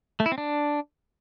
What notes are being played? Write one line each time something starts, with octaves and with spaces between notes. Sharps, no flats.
A3
E4
C4
D4